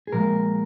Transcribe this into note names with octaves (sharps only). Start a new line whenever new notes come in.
G#4
A#2 F3 G#3 A#4